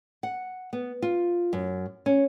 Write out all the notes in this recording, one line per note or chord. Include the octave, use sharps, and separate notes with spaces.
F#5
B3
F4
F#2
C#4